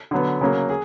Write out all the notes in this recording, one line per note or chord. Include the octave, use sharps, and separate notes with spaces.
D3 F#3 B3
C#3 F#3 A#3
G#4